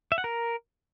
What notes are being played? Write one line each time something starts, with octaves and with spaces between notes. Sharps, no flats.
E5
F#5
A#4